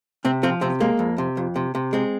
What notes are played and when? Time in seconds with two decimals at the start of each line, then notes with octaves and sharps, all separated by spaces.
0.25 C3 C4
0.43 F3 C4
0.61 C3 C4
0.80 G#3 A#3
0.99 F2
1.18 C3
1.37 F2
1.56 C3
1.75 C3
1.93 G#3 C4